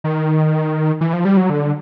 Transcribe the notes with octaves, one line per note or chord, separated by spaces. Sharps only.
D#3
E3
F3
G3
F#3
D3